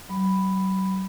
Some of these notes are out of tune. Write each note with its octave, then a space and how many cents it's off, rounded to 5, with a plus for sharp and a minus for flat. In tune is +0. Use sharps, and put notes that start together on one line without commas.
F#3 +40 B5 +5